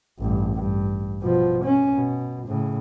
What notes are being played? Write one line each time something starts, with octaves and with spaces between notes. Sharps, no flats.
A1 G2
G2
B2 F3
C#4
B2
A2 C#3